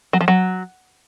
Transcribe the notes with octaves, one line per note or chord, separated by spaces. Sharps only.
F#3
F3
F#3